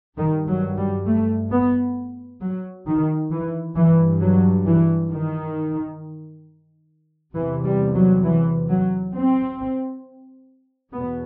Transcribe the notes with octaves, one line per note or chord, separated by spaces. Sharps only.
G2 D#3
F#3
G3
A3
B3
F#3
D#3
E3
G2 E3
F#3
E3
D#3
E2 C3 E3
G3
F#3
E3
F#3
C4
E2 B2 B3